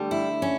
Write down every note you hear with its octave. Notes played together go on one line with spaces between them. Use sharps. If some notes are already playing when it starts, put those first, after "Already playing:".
Already playing: D3 G3 A3
E4
C#4